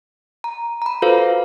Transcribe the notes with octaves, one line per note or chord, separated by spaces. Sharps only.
A#5
A#5 B5
F4 F#4 A4 B4 C5 F5